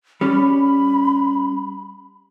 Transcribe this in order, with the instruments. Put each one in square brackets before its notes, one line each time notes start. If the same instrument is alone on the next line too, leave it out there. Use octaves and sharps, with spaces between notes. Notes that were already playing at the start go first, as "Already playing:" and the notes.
[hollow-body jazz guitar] G3 C#4 [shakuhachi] B5